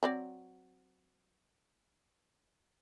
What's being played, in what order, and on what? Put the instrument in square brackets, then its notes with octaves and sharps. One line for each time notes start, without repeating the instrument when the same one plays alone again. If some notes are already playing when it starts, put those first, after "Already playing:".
[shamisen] F#3 C4 D5